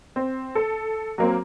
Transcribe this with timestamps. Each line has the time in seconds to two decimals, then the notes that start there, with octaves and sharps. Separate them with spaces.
0.16 C4
0.55 A4
1.18 F#3 A#3 C4